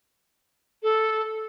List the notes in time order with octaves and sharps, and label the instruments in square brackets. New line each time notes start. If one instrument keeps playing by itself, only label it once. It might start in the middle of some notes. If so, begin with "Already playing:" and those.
[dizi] A4